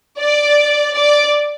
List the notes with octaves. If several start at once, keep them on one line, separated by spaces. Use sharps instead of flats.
D5
D5